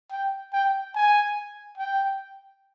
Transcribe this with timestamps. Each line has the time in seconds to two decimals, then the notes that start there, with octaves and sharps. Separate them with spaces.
0.11 G5
0.53 G5
0.95 G#5
1.78 G5